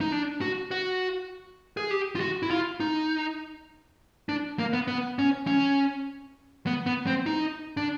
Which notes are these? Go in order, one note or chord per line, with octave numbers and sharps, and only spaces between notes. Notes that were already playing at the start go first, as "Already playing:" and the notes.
D#4
D4
F#4
F#4
G#4
G4
F4
F#4
E4
F4
D#4
D4
A#3
B3
B3
C#4
C#4
B3
B3
C4
D#4
D4